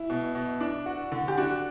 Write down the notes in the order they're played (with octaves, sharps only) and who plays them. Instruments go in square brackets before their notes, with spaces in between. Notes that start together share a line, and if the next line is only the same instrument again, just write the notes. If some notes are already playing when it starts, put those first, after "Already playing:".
Already playing: [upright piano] E4
[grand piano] B2
B2
D4
F#4
D3
[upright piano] G4
[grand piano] D4 [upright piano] F#4